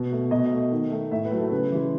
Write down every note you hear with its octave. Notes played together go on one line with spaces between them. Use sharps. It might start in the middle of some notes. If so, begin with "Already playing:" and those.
Already playing: B2
A3
B2 D#5
A3
D#3
A3
A2 E5
B4
F#3 A3
A4
C#3 B4
E3 G#3